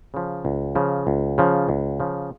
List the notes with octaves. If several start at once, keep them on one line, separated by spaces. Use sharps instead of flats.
C#3 F3
C#2
C#3 F3
C#2
C#3 F3
C#2
C#3 F3